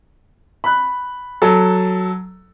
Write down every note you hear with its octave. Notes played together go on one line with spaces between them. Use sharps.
B5 F#6
F#3 A4